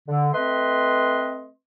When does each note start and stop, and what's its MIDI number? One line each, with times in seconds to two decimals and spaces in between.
0.09 0.28 50
0.33 1.49 57
0.33 1.49 60
0.33 1.49 71
0.33 1.49 75
0.33 1.49 84